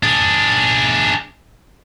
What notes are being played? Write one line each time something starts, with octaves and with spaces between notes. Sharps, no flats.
D4 G#4